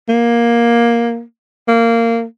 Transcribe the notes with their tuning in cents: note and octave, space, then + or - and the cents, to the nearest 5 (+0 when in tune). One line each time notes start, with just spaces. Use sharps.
A#3 +10
A#3 -20